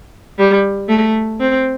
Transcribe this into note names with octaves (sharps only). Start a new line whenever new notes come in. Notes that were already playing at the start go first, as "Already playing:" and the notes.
G3
A3
C4